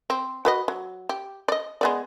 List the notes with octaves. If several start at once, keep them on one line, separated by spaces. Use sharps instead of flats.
C4
F#4 B4 D#5
F#3
G4
D5 D#5
G#3 B3 D5